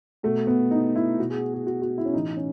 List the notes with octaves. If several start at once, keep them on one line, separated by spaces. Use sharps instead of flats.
B2 A3
B3
D#4
E4
B2 F#4
G#4
G#4
F#4
F#4
E4
C#4
A2 E3 D#4
C#4